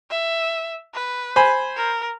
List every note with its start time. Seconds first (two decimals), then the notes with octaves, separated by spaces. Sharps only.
0.10 E5
0.94 B4
1.36 C5 G#5 B5
1.76 A#4